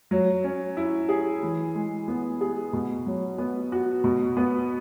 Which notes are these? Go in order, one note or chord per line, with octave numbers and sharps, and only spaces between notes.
F#3
C#4
E4
G#4
E3
G#3
B3
G#4
B2
F#3
B3
F#4
B2
B3